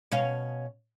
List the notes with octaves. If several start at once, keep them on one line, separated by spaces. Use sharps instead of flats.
B2 C#4 F5